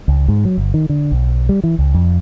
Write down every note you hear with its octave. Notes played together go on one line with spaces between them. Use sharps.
C#2
G#2
F#3
G1
D#3
D3
B1
G3
E3
C#2
F2